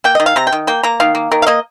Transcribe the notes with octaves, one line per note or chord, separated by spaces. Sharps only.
A#3 G5
D#5
D#3
F5
C3 A#5
G5
D#3
A#3 G5
A#3 A#5
D#3 F5
A#3
D#3 A#4
F5
A#3 D#5